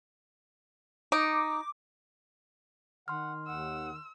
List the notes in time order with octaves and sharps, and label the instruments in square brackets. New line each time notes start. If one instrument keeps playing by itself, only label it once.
[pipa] D#4 [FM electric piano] D6
[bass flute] D#3 [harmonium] F#5 [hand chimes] C6 F6
[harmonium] D#2 F#5 [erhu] E6